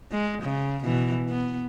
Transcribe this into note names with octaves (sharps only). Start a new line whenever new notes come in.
G#3
C#3
B2 E3
B3